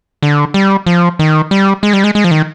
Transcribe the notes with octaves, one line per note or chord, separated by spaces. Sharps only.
D3
G3
F3
D#3
G3
G#3
G3
G#3
G#3
F3
D#3